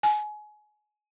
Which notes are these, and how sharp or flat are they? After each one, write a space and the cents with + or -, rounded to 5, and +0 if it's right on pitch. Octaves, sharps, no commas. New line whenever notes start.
G#5 +25